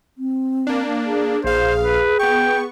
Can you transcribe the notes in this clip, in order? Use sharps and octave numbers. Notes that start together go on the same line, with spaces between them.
C4
A#3 D4
G#4
A#1 G#4 C5 F5
B4
B3 G5 C#6